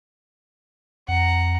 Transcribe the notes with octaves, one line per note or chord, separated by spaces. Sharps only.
F2 F#5 A#5